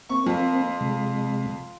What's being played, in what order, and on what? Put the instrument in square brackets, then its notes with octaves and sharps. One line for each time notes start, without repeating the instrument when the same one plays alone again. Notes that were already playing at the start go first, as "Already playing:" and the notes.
[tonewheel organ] A#3 C4 [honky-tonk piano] C#6
[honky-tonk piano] F2 [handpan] F4
[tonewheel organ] C3 G#3